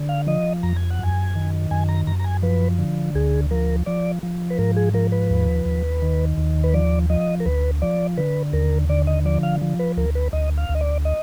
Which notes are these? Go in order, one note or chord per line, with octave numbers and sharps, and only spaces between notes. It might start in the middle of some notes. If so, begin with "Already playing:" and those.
Already playing: D3
F5
F3 D#5
F2 A#5
G#5
F#5
F#2 G#5
D#3
F#2 G#5
A#5
F#2 A#5
A#5
G#5
F3 B4
D3
D2 G#4
F3 A#4
F3 D5
F3
B4
G#2 A#4
G#4
F3 A#4
B4
D#2
D#2
D#3
D#2
B4
F3 D5
F3 D#5
A#4
D2 B4
F3 D5
D3 B4
D#2 A#4
D3 D5
D#5
F3 D5
F5
F3
B4
D2 A#4
B4
D2 D#5
F5
D2
D#5
D5
D#5